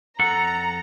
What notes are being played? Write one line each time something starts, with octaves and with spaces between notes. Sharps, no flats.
F2 A4 F#5 A#5